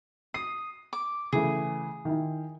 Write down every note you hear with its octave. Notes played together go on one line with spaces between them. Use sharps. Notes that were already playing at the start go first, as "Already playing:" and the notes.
D#6 C7
D6
C#3 E3 A3 G#4
D#3 E4